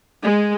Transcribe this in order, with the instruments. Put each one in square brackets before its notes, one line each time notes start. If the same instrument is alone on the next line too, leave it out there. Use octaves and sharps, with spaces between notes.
[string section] G#3